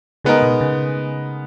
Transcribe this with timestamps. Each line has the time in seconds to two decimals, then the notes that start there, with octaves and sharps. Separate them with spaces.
0.24 C#3 G#3 B3 D#4 A#4
0.43 B2
0.61 C#3